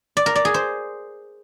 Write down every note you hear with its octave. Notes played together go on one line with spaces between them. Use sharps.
D5
A#4
D5
G#4
C5